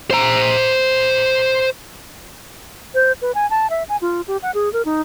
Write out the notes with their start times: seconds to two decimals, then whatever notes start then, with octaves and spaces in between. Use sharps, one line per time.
0.11 C5 A#5
2.94 C5
3.22 B4
3.35 G#5
3.50 A5
3.70 E5
3.89 G#5
4.02 F4
4.28 G4
4.43 F#5
4.55 G#4
4.73 A#4
4.85 D#4